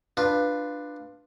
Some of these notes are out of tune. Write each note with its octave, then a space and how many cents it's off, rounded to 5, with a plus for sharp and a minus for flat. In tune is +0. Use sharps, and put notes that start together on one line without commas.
D4 +15 F4 +0 B4 +0